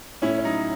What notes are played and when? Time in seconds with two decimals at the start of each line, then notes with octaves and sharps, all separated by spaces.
0.22 A2 C#4 E4
0.38 C#4
0.44 F#3 D#4